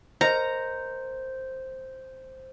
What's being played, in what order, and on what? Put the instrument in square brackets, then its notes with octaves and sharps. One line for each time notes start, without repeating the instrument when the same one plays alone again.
[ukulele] A#4 D#5 [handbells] C5 [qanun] A#5